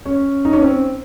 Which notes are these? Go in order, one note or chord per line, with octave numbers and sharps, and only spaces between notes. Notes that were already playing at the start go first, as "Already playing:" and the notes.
C#4
D#4
C#4
C4